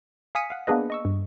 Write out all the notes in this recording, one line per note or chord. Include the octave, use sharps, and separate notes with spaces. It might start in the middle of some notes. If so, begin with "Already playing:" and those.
F5 G#5 D#6 B6 C#7 D#7
F5 F#5
A#3 B3 D4 G#4 B4 D#5
D#5 C#6 E6
G2